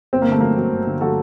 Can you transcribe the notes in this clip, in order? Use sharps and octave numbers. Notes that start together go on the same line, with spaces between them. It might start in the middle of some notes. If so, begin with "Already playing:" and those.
G1 C4
A#3
D3 A3
F#3 A#3
F#3
G1
D3
F#3 F#4 A4